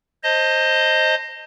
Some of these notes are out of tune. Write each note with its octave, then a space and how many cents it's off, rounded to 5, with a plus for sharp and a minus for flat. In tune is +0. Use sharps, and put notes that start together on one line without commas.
C5 +10 D#5 +0 A5 +40